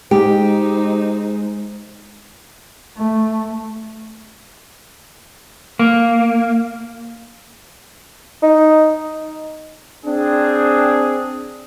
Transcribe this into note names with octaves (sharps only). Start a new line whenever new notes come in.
G#3 D#4 G4 C5
A3
A#3
D#4
C4 D4 G#4